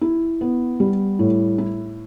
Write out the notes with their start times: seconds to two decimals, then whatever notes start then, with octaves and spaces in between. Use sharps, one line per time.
0.01 E4
0.41 B3
0.80 G3
1.19 A2
1.58 E4